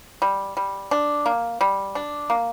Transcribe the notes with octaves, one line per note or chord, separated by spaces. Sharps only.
G3
G3
D4
A#3
G3
D4
A#3